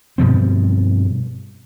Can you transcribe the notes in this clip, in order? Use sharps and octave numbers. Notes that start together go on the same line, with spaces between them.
G2 B2 F3 C4